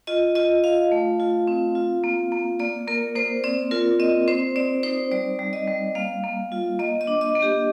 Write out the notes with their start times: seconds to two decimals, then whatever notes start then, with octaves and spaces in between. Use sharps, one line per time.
0.07 F4 D#5
0.35 F4 D#5
0.64 F4 F5
0.92 A3
1.20 F4
1.47 C4
1.75 F4
2.04 A#3
2.32 A#3
2.60 A#3 D5
2.87 A#3 A#4
3.15 A#3 C5
3.44 C4 D5
3.71 F4 A#4
4.00 C4 D#5
4.28 C4 C5
4.56 C4 D5
4.83 D#4 C5
5.11 G3 D5
5.39 G3
5.53 D#5
5.68 G3
5.95 A#3 F5
6.23 A#3
6.52 F4
6.79 A#3 D#5
7.01 D#5
7.07 D4
7.21 D#5
7.36 A#3
7.42 G4